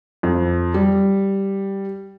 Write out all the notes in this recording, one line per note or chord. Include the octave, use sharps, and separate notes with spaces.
F2
G3